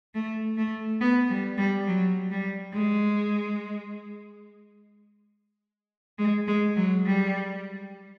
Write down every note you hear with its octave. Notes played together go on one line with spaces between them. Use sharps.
A3
A3
B3
G3
G3
F#3
G3
G#3
G#3
G#3
F#3
G3